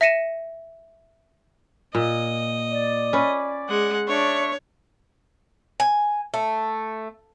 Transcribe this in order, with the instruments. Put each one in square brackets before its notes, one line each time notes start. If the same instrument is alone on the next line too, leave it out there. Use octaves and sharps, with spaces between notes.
[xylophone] E5 A#6 C#7 D#7 E7
[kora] A#2 [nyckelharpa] D#5
[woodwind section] D5
[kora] C#4 B4
[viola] G#3 [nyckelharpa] F#5
[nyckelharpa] D4 [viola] C#5 [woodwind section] D5 E5 C#6
[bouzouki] G#5
A3